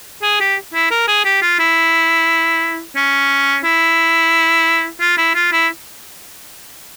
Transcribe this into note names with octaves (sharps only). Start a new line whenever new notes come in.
G#4
G4
E4
A#4
G#4
G4
F4
E4
C#4
E4
F4
E4
F4
E4